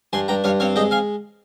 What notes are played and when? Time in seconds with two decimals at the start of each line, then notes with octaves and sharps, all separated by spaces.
0.13 G2 G#5 C6
0.28 G2 G5 A#5
0.44 G2 C#5 F5
0.60 C4 C#5 F5
0.76 G#3 D#5 G5
0.91 F5 G#5